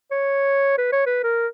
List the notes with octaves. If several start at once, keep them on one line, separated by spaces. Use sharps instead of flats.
C#5
B4
C#5
B4
A#4